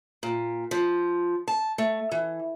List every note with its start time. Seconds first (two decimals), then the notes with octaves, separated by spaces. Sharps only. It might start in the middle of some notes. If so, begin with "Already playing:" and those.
0.23 A#2
0.71 F3
1.48 A5
1.78 A3
2.12 E3